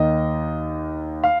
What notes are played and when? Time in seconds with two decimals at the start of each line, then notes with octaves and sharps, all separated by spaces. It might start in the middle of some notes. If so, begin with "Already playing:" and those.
Already playing: D#2 D#3 D#5
1.24 F5